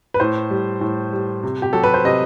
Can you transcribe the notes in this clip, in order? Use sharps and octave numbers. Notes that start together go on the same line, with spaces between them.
B4
A2 C5
G3
A2
G3
C3
G4
F#3 A4
B4
C5
C3 D#5